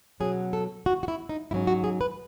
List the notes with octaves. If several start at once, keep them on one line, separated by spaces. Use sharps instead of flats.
B2 F#3 C#4 G#4
A4
F#4
F#4
E4
D#4
G#2 F#3 C#4 E4
F#4
G#4
B4